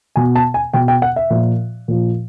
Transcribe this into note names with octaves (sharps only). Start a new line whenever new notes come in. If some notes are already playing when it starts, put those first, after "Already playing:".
B2 G#5
A5
G#5
B2 G5
G5
F#5
E5
A#2 F3
A#2 F3